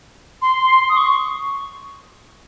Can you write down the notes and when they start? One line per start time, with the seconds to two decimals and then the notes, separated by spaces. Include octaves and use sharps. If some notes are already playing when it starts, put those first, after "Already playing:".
0.42 C6
0.89 D#6
0.97 C#6